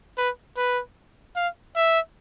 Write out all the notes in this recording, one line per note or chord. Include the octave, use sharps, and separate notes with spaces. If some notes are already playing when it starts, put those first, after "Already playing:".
B4
B4
F5
E5